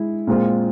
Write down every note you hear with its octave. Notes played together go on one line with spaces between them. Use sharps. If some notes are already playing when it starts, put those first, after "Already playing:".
Already playing: G#3 E4
A#2 G#3 C4 F4